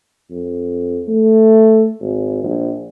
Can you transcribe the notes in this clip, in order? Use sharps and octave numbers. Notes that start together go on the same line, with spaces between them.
F2
A3
G#1
A#1